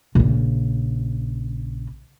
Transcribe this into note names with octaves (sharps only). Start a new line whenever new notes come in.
A#1 C#3